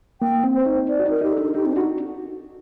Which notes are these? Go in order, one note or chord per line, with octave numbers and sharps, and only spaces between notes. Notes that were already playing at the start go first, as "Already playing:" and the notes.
A#3 G5
C4
C5
D#4
D5
F#4
D#4
A#4
D#4 G4
D4 A4
D#4 G4
C4
D4
D#4 F#4